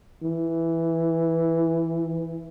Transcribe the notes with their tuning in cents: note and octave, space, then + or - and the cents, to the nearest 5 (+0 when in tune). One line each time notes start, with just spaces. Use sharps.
E3 +0